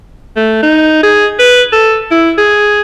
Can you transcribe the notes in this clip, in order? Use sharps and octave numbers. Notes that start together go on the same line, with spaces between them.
A3
D#4
G#4
B4
A4
E4
G#4